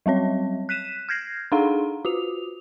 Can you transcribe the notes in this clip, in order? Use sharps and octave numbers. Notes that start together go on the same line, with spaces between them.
F#3 G3 C4 C#5
F#6 B6 D#7 E7
F6 G6 G#6 A#6 C7
D4 D#4 G#4 F5 F#5 A#5
F4 F#4 F7